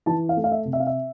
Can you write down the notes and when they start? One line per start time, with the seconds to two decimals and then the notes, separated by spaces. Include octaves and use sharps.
0.06 E3 A5
0.29 F5
0.37 A3
0.44 F5
0.52 E5
0.65 C3
0.73 E5
0.80 F5
0.87 E5